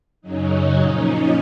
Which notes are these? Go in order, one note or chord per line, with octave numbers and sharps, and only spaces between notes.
F#2 C#3 F#3 C#4 D#4
A#2 F3 C#4 D#4